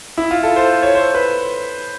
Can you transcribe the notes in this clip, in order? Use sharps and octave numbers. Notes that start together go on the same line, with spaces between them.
E4
F4
A4
C5
C#5
C5
B4